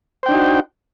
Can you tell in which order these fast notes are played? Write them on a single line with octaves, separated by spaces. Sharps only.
C5 G5 D4 D#4 F#4